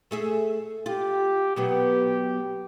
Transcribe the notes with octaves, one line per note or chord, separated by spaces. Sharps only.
A3 G#4 E5
F4 G4
B2 F#3 B3 G4